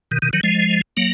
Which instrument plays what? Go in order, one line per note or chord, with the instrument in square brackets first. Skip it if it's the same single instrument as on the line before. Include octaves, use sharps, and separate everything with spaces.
[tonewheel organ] B2 D#3
B2 D#3
D#3 F#3
F3 G#3
F#3 A#3